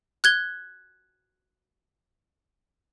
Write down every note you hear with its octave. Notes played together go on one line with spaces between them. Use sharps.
F#6 G#6 G7